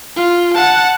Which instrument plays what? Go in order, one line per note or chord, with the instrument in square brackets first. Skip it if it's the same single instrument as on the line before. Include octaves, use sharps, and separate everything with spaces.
[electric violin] F4
F#5 A5